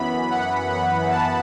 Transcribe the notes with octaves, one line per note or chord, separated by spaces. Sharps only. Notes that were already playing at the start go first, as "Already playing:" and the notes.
Already playing: F#2 E3 B3 B5
F#5
F#5
A5